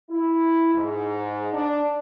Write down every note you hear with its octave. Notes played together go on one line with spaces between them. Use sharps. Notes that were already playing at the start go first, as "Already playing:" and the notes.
E4
G#2
D4